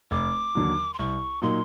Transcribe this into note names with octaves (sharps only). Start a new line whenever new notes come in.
F1 D6
D#2 D3 F#3
C6
C2 C#6
A#2 F#3 A#3 D#4 C6